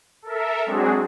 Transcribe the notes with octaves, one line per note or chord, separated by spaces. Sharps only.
A4 A#4 E5
F#3 G#3 C4 D4 F#4 G#4